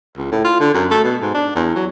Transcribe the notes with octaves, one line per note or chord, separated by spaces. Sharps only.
C#2
A2
F4
D3
F#2
A3
B2
G#2
D4
E2
F#3